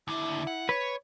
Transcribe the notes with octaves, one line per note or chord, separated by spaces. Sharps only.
D#2 D3 E4
F#5
B4 C#5